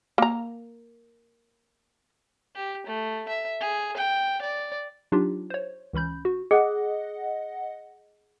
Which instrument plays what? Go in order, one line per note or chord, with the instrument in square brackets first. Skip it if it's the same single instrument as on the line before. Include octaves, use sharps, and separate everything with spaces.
[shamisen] A#3 A#5
[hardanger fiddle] G4
A3
E5
G#4
G5
D5
[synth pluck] F#3 D4 D#4 F4 G4
C5 C#5
C#2 E3 C#4 B5 G6
F#4
[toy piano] G#4 [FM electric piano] D#5 F#5